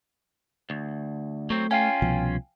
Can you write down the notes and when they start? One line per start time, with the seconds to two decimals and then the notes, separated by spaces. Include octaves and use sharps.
0.70 D2
1.50 F#3 A3 C4
1.71 C#4 F4 F5 G5 G#5
2.02 C2 B2 F3